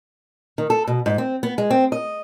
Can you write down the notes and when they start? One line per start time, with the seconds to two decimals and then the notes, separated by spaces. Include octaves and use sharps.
0.58 D#3
0.70 A4
0.87 B2
1.06 G#2
1.18 C4
1.43 B3
1.58 G#3
1.70 C4
1.92 D#5